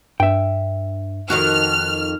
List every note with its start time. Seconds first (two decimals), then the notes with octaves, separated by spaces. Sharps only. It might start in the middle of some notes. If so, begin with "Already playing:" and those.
0.20 G2 E5 G5
1.30 F2 D#3 F#4 F6 F#6